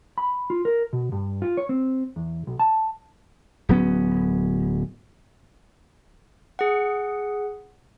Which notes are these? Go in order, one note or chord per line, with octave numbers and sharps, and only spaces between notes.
B5
F4
A#4
B2
G2
F4
C#5
C4
E2
B1
A5
D1 F#3 B3 C#4
G#4 F#5